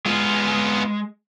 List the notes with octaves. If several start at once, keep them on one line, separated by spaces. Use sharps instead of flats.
G#3 B3 F4